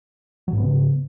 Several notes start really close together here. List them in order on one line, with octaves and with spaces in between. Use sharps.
F#3 G#2 B3 C#3